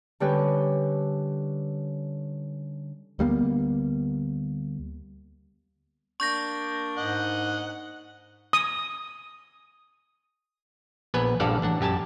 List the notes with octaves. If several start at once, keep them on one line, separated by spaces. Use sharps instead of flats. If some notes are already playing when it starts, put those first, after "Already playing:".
D3 G3 C#4 G4 B4 C#5
D2 G3 A#3 B3
A#3 D4 C#6 G6 A#6
G#2 D#5 F#5
D#6
A#1 B3 B4 G#5
A#1 G2 A4 D5 F5 F#5
A1 D4 F#5
F#2 G4 G#5 A5